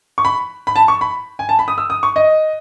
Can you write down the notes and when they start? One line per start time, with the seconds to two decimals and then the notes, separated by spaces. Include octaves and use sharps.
0.18 C#6
0.25 B5
0.67 B5
0.76 A5
0.88 C#6
1.01 B5
1.39 G#5
1.49 A5
1.59 B5
1.68 D#6
1.78 E6
1.90 D#6
2.03 C#6
2.16 D#5